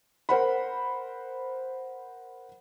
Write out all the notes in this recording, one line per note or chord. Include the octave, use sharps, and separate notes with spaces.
A#4 C5 F#5 B5